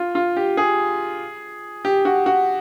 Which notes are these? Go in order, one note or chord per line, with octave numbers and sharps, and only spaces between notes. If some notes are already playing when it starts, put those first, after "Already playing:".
Already playing: F4
F4
G4
G#4
G4
F#4
F#4